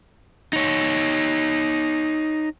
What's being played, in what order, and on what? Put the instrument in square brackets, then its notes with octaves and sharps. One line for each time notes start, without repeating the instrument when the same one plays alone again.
[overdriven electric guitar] D#4 C#5